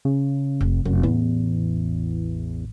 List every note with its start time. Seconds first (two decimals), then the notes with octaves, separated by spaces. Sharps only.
0.05 C#3
0.61 F1
0.85 F1 F#2
1.03 A1 E2